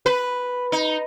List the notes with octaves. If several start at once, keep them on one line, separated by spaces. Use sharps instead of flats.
B4
D#4